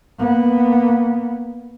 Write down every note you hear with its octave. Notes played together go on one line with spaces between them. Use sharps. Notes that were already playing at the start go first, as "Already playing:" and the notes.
A#3 B3